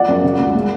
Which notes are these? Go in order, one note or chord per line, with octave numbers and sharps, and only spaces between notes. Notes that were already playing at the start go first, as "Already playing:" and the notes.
Already playing: F3 D5 F#5
F#2
C#3
C#2
G#3